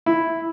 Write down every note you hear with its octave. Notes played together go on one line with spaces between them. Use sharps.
E4